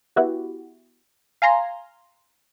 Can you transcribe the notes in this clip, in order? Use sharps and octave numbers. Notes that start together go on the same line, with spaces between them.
B3 E4 F#4 G4
F5 G#5 A#5 C6